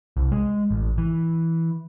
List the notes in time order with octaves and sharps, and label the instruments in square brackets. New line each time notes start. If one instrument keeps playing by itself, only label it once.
[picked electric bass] C2
G#3
A1
E3